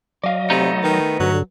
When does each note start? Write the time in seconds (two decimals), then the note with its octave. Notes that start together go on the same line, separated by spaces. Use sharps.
0.24 F#3 D5 D#5 F5
0.50 C3 A3 B3 D#4
0.84 D#3 B4
1.20 G2 D3 F#3